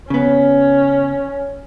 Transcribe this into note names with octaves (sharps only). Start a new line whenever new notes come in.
C#3 B3 C#4